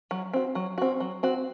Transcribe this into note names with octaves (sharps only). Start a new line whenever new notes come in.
F#3
C4 F#4
F#3
C4 F#4
F#3
C4 F#4